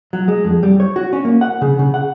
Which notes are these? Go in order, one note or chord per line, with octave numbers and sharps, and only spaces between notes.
F#3
G#3
F2
G3
C#5
F#4
C#4
A#3
F#5
C#3
C#3
F#5